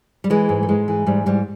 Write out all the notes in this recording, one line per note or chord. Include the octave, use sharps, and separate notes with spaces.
G3
E3 G#3
G#2
A3
G#2 G#3
E3
G#2 G3
G#2 G3